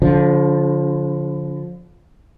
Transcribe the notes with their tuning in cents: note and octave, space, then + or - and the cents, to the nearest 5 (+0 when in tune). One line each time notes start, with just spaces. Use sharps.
D3 -30 F3 +15